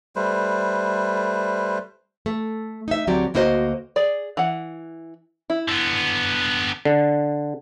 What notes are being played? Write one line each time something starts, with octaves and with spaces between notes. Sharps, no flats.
G3 A3 B4 C5
A3
D#4 E5
D2 F#3 C4 G4 D5
D2 A#3 E4 F#4 C5 D#5
G#4 D5
E3 F#5
E4
D3 B3
D3